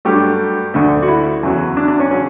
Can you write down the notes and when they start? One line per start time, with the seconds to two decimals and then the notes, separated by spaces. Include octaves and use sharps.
0.05 G2 F#3 A3 G4
0.74 D2 D3 A3
1.02 F#4
1.08 E4
1.43 E2 C#3 F#3
1.77 D4
1.88 D4
2.00 C#4
2.11 C#3 F#3 C#4